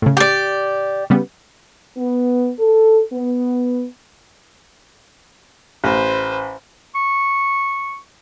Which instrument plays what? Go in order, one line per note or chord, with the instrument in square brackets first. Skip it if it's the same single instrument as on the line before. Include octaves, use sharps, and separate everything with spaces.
[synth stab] A2 C#3
[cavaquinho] G4 D5
[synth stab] C#3 G3 B3
[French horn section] B3
A4
B3
[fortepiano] A1 [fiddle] B4 C5
[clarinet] C#6